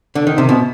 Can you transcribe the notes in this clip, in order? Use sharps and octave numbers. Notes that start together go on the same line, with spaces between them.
D3
D#3
C3
B2